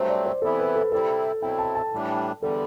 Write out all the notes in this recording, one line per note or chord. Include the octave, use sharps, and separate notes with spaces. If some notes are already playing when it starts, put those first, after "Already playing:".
Already playing: G2 F#3 A3 C4 C5
D5
C5
C3 E3 B3 E4 A4
B4
A4
C3 G3 C4 E4 A4
B2 F#3 C4 E4 G5
A5
A5
A2 E3 G3 D4
E2 D3 G3 A4